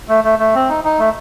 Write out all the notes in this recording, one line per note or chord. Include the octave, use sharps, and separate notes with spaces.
A3
A3
A3
C4
D#4
D#4
A3